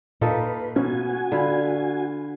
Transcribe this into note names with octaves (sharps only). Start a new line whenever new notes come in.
A#2 A#3 D#4 F4 A4 B4
B2 F3 C#4 F#4 G#5
D3 F4 B5